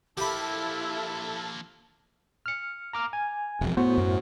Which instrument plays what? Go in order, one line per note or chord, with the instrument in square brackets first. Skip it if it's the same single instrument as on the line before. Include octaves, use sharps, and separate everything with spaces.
[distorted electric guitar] F3 A#3 [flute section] E4 [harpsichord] G4 B5 [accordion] A4 A5
[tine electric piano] F6 C#7
A#5 D6 F6
G#5
[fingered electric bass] E1 F2
[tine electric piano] A2 F#4 C5 [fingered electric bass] B3
[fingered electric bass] F#2